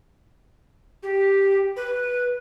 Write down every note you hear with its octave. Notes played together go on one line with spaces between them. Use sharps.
G4
B4